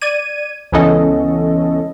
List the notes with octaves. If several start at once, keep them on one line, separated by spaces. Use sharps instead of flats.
D5 G#6 D#7
C#2 E3 B3 C#4 A4 D#5